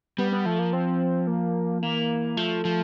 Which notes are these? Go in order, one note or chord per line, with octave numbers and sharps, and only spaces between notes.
G3 B3
B3
F3 A3
A#3
C4
A#3
E3 A#3
F3 A3
F3